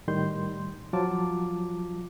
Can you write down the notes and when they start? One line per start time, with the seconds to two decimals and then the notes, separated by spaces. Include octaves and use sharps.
0.08 A2 D#3 G3 C6 G6
0.93 F3 F#3 F4 A5 D6